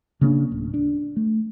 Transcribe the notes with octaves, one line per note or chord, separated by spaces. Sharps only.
C#3 A#3 B3 D4
D1
D4
A3